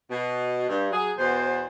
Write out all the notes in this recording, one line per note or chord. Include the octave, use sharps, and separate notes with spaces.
B2
G2
F#3 G#4
E2 B2 C5